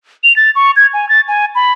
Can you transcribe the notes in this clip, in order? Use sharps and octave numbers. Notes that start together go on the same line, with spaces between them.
F7
A6
C#6
G#6
G#5
A6
G#5
B5